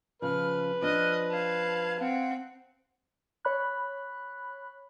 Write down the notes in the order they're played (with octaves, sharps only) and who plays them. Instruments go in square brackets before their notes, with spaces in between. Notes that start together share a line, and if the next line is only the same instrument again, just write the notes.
[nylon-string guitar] C#3 F3 [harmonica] B4 [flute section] F6
[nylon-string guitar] F3 D4 [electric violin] D#5 [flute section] F6 F#6
[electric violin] F5 A5 [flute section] G#6
[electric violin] C4 [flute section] F5 F#5
[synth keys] C#5 B5 F#6